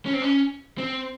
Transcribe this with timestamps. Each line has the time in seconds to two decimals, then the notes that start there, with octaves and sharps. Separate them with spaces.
0.06 C#4
0.13 C4
0.22 C#4
0.78 C4